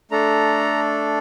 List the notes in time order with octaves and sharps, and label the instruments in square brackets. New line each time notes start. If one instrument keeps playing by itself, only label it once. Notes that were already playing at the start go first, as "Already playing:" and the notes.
[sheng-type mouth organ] A3 D4 A4 A#5